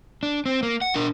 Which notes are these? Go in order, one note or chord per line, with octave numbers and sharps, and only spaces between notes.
D4
C4
A#3
F#5
D4 A#4